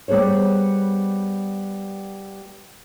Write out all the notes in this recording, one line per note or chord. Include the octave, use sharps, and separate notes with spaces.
G3 B3 G#4 C5 C#5